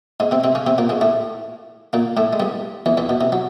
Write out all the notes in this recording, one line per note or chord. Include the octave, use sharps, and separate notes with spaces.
G#2 G#3
C3 C4
C3 C4
C#3 C#4
C3 C4
A#2 A#3
G#2 G#3
A2 A3
A#2 A#3
A2 A3
G#3
G2 G3
E2 E3
E2 E3
B2
C3
F#3